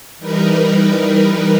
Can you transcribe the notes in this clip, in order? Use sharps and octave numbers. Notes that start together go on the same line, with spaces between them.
E3 G3 D#4 A#4 B4